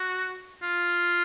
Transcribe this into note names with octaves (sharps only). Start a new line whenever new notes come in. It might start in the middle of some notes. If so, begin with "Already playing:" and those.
Already playing: F#4
F4